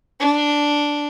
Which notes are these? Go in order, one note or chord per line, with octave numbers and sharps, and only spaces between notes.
D4